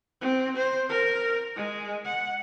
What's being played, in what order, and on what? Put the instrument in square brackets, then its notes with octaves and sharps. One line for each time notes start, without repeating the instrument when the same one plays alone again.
[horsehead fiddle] C4
C5
A#4
G#3
F#5